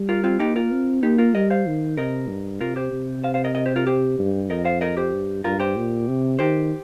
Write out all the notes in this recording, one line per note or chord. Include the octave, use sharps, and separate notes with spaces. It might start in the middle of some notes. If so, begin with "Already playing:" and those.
Already playing: G3
F4 A#4
C4 F4
A#3 D#4 G4
F4 A#4
C4
A#3 D#4 G4
F4 A#4
G3 A#4 D#5
C5 F5
D#3
C3 A#4 D#5
G2
C3 F4 A#4
G4 C5
C3
C5 F5
C5 F5
A#4 D#5
A#4 D#5
G4 C5
F4 A#4
G4 C5
G2
F2 A#4 D#5
C5 F5
A#4 D#5
G4 C5
G2
G2 F4 A#4
G4 C5
A#2
C3
D#3 G4 C5